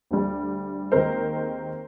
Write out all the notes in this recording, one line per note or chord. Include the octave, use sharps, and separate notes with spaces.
D2 D3 G3
D#2 D#3 G#3 C4 A#4 C5